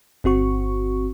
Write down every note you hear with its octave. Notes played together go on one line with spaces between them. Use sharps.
G1 C4 F#4 C#6